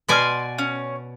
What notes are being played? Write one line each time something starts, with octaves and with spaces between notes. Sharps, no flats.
B2 D5 G#5 C6 D#6 F6
C#4